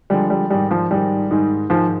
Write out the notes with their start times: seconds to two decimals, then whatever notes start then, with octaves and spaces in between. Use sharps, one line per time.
0.10 D3 F3 G3 G#3
0.30 G3
0.50 G#2 D#3 G3 G#3 D#4
0.71 F3
0.91 G#2 D#3 G3 G#3 D#4
1.30 G#2 D#3 G#3 D#4
1.70 G#2 D#3 F3 G#3 D#4